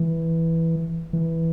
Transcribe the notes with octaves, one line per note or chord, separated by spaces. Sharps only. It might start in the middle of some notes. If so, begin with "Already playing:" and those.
Already playing: E3
E3